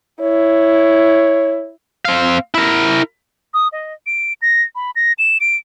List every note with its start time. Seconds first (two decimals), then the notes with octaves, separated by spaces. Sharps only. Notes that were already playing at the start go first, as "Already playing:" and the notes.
0.21 E4 C#5
2.05 C4 F5
2.54 E4 A#4
3.54 D#6
3.72 D#5
4.06 D7
4.42 A#6
4.75 B5
4.96 A#6
5.19 E7
5.40 D7